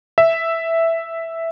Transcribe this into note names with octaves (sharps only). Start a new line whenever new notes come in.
E5